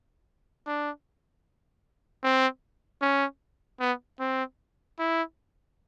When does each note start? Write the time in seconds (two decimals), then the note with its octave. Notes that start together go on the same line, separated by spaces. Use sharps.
0.67 D4
2.24 C4
3.01 C#4
3.80 B3
4.19 C4
4.99 E4